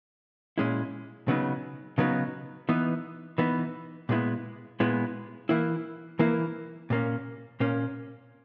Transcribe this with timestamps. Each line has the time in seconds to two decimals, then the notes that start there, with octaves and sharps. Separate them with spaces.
0.58 A#2 G#3 C#4 E4
1.28 C#3 F#3 B3 D#4
1.98 C#3 F#3 B3 D#4
2.69 E3 B3 D#4
3.38 E3 B3 D#4
4.09 A#2 G#3 B3 E4
4.80 A#2 G#3 B3 E4
5.49 E3 A#3 E4
6.19 E3 A#3 E4
6.90 A#2 A#3 C#4
7.60 A#2 A#3 C#4